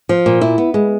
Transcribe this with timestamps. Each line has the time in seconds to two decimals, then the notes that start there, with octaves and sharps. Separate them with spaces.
0.09 F3
0.26 A#2
0.41 E4
0.58 B3
0.74 G#3